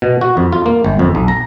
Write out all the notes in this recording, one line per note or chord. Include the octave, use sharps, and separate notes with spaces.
B2
F#4
F2
F4
A#3
G1
F2
B1
A#5